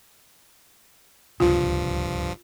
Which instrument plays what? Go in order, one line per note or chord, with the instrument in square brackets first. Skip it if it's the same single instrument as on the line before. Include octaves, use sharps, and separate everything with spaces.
[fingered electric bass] D1 C#2 C3 [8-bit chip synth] G2 F3 [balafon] F4